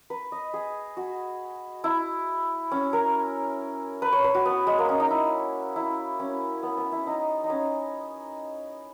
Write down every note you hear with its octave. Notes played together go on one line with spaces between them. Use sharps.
B4
D#5
G#4
F#4
E4
C#4
A#4
B4
C#5
B4
F#4
B3
G#3
A#3
C#4
D#4
E4
E4
C#4
B3
B3
E4
D#4
D#4
C#4